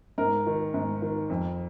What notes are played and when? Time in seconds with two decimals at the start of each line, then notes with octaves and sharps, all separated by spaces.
0.18 G#2 A#4
0.47 D#3
0.74 G#2
1.02 D#3
1.30 F2